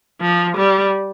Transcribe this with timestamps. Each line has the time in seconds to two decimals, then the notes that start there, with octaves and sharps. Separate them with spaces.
0.21 F3
0.57 G3